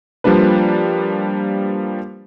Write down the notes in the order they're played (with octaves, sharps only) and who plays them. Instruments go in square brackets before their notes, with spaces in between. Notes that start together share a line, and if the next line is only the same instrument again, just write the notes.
[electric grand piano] F3 G3 A#3 D4 B4